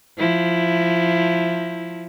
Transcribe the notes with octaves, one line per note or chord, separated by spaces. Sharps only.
F3 E4